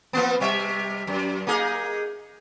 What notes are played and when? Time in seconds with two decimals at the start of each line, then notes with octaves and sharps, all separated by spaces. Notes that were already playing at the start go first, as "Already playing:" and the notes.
0.13 F3 A#3 B3
0.40 C3 G3 E5
1.07 F#2
1.47 A#3 D#4 G#4